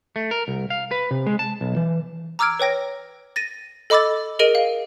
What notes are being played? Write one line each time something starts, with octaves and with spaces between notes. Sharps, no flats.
A3
A#4
C2
F5
B4
C3
G#3
A5
B1
E3
A#5 D6 E6 F6 G#6 D7
B4 C#5 G5 A#6
A6 A#6 D#7
A4 D#5 B5 D6 E6 A6
G#4 A#4 D#5 D7 D#7 F7
F5